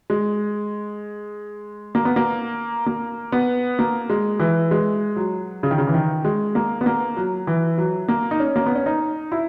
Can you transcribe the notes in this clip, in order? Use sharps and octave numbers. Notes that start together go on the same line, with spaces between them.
G#3
A#3
B3
A#3
A#3
B3
A#3
G#3
E3
G#3
F#3
C#3
D#3
C#3
E3
D#3
G#3
A#3
B3
A#3
F#3
E3
F#3
A#3
D#4
C#4
A#3
B3
C#4
D#4
E4